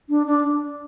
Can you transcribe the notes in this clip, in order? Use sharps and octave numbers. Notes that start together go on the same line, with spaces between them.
D4
D4